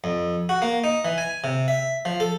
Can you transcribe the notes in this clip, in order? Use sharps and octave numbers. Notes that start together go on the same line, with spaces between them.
F2
F#4
A#3
D#4
E3
G#5
C3
E5
F3
A4